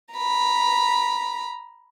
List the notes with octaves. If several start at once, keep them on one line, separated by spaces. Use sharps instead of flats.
A#5 B5